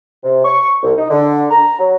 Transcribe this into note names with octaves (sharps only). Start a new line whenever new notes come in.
C3
C#6
C2
D#4
D3
A#5
F#3